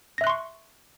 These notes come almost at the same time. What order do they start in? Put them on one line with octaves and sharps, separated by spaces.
A#6 E5 F#6 C6 C#6